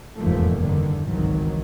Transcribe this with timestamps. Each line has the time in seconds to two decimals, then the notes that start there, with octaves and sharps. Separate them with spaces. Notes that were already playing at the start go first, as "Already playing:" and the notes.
0.16 F1 E2 G#2 F3 A3 A#3
0.60 E2 G2 D3 D#3
1.08 G#1 C#2 D#3 E3 F#3